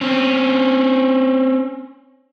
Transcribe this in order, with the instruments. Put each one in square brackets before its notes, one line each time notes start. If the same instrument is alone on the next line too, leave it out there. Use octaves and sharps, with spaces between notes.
[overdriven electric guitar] C4 C#4